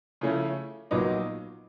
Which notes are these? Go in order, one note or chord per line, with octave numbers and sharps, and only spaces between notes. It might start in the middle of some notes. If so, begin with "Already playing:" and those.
C#3 F3 A3 C#4 E4
A#1 A#2 F#3 B3 D#4